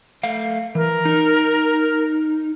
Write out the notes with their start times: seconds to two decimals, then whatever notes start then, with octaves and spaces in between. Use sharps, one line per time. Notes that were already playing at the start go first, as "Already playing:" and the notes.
0.23 A3 F5
0.75 E3 A#4
1.05 D#4